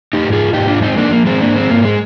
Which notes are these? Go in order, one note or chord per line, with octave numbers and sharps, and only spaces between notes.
D#4 G4
G#2
F4 G#4
G#2 D#4 G4
D4 F4
G#3 C4 D#4
A#3 D4
F3 A#3
G#3 C4
G#2 A#3 D4
G#3 C4
G#2 A#3
G#3